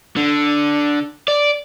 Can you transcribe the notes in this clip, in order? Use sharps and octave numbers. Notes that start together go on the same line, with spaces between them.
D3
D5